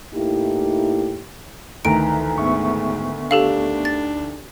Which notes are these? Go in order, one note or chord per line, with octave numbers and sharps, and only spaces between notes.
A2 A#3 D#4 E4 G4
D2 D#3 E3 A#5 D7
G#2 B3 E5 C#6
D4 G4 A4 F5
A6